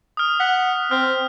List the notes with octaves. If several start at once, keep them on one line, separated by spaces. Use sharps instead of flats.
D#6 F6
F#5 B6
C4 F6